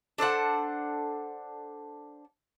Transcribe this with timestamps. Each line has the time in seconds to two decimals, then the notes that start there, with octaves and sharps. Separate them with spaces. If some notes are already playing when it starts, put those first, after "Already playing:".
0.18 D4 A4 C5 F#5